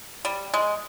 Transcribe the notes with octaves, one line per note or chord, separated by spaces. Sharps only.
G3
G#3